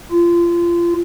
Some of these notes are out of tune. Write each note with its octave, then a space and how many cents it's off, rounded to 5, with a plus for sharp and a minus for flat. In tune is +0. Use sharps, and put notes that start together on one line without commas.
F4 -25